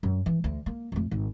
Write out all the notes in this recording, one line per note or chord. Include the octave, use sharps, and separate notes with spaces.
F#2
E3
D2
A#3
F2 A3
G#1